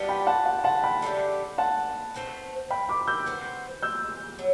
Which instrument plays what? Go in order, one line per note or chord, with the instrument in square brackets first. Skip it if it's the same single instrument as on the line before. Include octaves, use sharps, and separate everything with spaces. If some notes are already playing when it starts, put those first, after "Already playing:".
Already playing: [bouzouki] G3 B3 D4
[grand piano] G5 B5
F#5 A5
F#5
F#5 A5
G5 B5
[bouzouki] D3 A3 D4 G4
[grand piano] F#5 A5
[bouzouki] A3 C4 F#4 B4
[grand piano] G5 B5
B5 D6
E6 G6
[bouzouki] B3 F#4 C5
[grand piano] E6 G6
[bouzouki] F#3